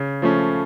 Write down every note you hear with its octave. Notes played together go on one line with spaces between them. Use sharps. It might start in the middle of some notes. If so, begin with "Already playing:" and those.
Already playing: C#3
F3 A3 C#4